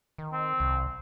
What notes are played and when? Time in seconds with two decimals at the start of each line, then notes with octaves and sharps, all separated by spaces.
0.18 D#3
0.33 C4
0.60 C2